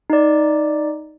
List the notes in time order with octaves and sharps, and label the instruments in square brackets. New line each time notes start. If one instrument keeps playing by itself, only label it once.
[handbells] D#4 D5